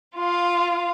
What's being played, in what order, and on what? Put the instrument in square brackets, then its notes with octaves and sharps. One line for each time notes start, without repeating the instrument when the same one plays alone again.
[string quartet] F4 F5